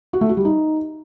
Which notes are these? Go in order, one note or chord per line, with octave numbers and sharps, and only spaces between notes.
F#4
A3
F#4
G3
D#4